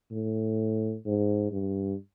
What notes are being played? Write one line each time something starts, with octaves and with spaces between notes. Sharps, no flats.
A2
G#2
G2